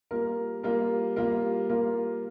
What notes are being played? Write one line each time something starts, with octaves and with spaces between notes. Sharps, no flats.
G3 A#3 F4 A#4
G3 A#3 F4 A#4
G3 A#3 F4 A#4
G3 A#3 F4 A#4